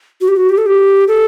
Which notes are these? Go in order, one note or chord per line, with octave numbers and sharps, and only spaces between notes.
F#4
G4
F#4
G4
A4
G4
A4